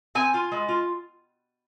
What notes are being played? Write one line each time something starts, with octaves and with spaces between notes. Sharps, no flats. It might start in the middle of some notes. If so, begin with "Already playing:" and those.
C4 G#5
F4
G#3
F4